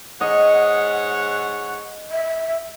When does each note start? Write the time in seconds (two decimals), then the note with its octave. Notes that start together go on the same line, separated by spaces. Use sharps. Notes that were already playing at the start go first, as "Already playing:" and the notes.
0.21 G#2 C#5 D#5 F#5
2.11 E5